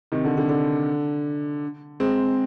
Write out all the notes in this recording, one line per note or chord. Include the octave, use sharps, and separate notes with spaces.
C3 D#3
D3
D3
D3
G#3 C4